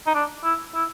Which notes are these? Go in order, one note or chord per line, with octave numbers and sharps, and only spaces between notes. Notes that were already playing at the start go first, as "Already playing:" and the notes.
D#4
D4
E4
E4